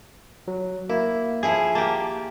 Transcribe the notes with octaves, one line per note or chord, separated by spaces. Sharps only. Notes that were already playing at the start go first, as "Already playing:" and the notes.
F#3
A#3 E4
F3 E4 G#4 G#6
A#3 G4 A5